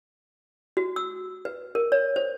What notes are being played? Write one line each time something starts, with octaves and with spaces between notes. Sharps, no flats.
F#4
E6
B4
A#4
C#5
C5